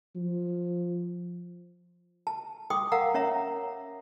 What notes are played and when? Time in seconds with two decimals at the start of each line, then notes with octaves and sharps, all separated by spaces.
0.15 F3
2.27 A5
2.70 G5 C6 D6 D#6
2.92 A#4 F5 F#5 A#5
3.14 C#4 C#5 E5 A#5